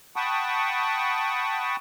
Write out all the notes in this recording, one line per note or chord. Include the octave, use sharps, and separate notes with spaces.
F#5 G5 A5 B5 C#6 D#6